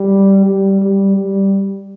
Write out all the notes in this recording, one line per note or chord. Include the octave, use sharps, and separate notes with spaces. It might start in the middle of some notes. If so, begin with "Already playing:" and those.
Already playing: G3
G3
G3
G3